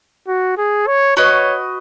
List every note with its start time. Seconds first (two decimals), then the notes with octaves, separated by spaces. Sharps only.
0.28 F#4
0.58 G#4
0.87 C#5
1.17 F#4 B4 C#5 D#5